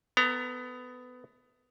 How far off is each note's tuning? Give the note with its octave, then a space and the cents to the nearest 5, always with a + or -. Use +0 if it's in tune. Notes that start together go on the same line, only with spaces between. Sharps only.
B3 +20 A4 +45 A#5 +0